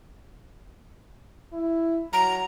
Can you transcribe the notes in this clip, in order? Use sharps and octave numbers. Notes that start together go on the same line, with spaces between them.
E4
F#3 A#5